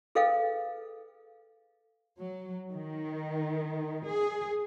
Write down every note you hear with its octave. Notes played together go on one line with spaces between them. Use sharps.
G#4 A4 B4 D#5 F5 G5
F#3
D#3
G#4